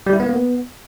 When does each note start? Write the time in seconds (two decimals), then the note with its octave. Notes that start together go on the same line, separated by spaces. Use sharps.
0.07 G3
0.13 E4
0.20 B3
0.26 A#3
0.33 B3